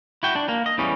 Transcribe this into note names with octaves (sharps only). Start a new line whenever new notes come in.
E4 F#4 G5
D4
A#3
D#5
E2 E3 G3 C#4